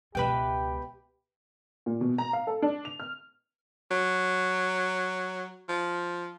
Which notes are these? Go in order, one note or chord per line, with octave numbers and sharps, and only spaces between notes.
C#2 B2 G#3 G4 B4 E5 G5 B5
A#2
B2
A#5
F5
A4
D4
F7
F6
F#3
F3